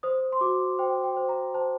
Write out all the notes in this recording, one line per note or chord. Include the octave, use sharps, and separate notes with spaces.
C5 D#6
C6
F#4 D6
C5 G5
G5
C5
A#5
C5 A5